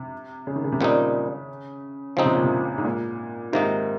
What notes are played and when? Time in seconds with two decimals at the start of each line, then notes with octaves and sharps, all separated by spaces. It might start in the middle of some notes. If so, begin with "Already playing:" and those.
Already playing: C3
0.47 C#3
0.56 D#3
0.64 C#3
0.72 C3
0.81 A#2 C#3 G3 C4 D#4
2.17 C#3 F3 C4 D#4
2.25 C3
2.35 A#2
2.44 C3
2.78 G#2
2.84 A#2
3.52 G#2 C3 D#3 A#3 D#4